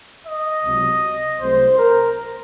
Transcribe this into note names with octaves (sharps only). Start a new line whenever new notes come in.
D#5
C#2 C3 F#3
C2 C3 F#3 A3 C5
A#4